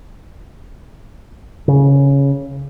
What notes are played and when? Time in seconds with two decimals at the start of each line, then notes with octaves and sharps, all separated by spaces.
1.68 C#3